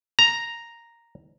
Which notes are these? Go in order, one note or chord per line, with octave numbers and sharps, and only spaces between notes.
A#5